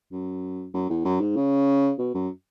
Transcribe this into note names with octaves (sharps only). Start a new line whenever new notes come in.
F#2
F#2
E2
F#2
G#2
C#3
B2
F#2